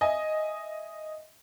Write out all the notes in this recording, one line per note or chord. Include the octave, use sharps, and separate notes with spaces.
D#5 E5 G#5